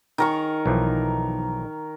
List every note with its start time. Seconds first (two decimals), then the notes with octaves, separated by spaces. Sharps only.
0.18 D#3 A#4 C#6
0.66 B1 E3 F3